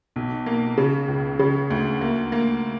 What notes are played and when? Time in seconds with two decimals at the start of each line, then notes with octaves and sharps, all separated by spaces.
0.16 B1
0.46 A#3
0.77 C#3
1.08 C#2
1.39 C#3
1.70 D2
2.01 A#3
2.32 A#3